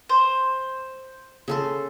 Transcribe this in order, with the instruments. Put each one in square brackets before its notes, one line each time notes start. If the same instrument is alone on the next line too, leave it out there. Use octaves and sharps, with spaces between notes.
[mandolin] C5
[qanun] C#3 A4 C6